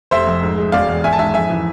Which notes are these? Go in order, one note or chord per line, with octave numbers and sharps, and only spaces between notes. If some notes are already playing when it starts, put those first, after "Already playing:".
F1 C5 E5
F2
G#2
G#3
E1 D5 F5
E2
G#1 E5 G#5
A5
G#2 E5 G#5
F2 E5 G#5
E3